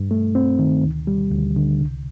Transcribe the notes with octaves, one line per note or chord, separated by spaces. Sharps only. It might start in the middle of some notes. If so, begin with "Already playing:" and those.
Already playing: G2
A3
C4
D#3
D2
G3
D2
D3
C2